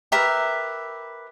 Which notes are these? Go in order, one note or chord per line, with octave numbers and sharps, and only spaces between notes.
G4 A#4 B4 E5